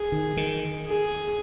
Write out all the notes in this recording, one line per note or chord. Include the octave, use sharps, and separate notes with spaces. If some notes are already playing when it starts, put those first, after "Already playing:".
Already playing: G#4
D#3
D#3
G#4